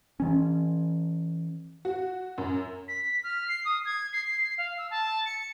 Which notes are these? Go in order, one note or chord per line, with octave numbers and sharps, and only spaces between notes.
E3 C#4
F#4
F#2
B6
F6
C7
D#6
G#6
C7
C7
F5
E6
A5
C#7